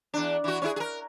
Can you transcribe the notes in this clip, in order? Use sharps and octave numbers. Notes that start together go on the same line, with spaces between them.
E2 D4
E3 F#4
C#4 E4 G#4
G#4 A#4